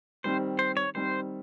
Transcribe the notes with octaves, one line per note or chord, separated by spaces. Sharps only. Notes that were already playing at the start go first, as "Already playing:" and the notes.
D#3 G3 C4 C5
C5
C#5
D#3 G3 C4 C5